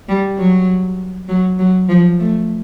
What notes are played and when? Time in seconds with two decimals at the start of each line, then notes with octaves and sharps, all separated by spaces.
0.08 G3
0.38 F#3
1.28 F#3
1.59 F#3
1.89 F3
2.19 A3